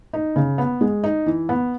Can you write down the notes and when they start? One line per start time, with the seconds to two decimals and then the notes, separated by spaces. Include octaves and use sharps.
0.13 D#4
0.36 C#3
0.58 B3
0.81 G#3
1.04 D#4
1.26 E3
1.49 B3